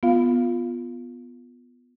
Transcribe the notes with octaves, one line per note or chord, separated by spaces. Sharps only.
B3 F4 F5